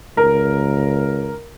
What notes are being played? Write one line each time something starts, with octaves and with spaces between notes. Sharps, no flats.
C#2 A#4